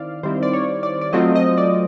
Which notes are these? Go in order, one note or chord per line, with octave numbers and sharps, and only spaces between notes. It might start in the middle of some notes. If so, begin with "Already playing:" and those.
Already playing: D#3 C4 E4 D5 F5
D#3 G3 C4 E4 C5
D5
C#5
D5
D5
F#3 A3 C4 F4 D#5
D#5
D5